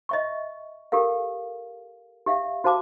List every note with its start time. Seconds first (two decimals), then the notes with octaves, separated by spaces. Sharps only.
0.09 D#5 E5 C#6
0.92 G4 A4 A#4 F5
2.26 G4 E5 F5
2.64 F#4 C5 F5 A5 D6